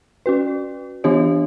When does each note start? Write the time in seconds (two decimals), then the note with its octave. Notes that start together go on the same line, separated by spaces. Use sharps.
0.26 C#4 F#4 B4
1.04 E3 B3 D4 G4 C#5